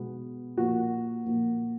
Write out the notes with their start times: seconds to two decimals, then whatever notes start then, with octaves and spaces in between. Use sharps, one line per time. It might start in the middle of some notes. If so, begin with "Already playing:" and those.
Already playing: B2 G#3 B3
0.58 A#2 F3 A#3 F#4
1.25 A#2 F3 A#3